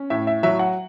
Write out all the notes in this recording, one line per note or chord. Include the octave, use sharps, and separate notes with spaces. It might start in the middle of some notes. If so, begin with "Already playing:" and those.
Already playing: C#4
A2 E5
E5
F#3 E5
F#5